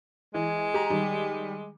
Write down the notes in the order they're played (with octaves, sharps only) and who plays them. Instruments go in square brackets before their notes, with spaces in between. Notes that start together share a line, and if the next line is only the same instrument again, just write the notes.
[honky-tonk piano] E3 [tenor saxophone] G#3
[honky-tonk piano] G4 A#5
D#3 G3